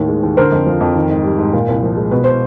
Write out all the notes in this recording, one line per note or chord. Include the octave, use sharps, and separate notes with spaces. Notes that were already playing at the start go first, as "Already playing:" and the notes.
Already playing: D#2 A2 D#3
G#3
D#2
D3 A#4 C5
F2
F3
F2
D#3
G#2
G3
G#2
A#2
C2
F3
G#3
B2 B4
C5